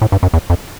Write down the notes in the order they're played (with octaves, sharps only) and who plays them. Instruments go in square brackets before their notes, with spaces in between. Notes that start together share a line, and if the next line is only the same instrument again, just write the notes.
[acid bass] A2
G2
F#2
E2
F2